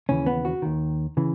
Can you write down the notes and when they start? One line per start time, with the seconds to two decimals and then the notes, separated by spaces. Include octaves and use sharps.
0.09 D#2 C#3 E3 C#4
0.26 B3
0.45 F#4
0.62 D#2 D#3
1.17 C#3 E3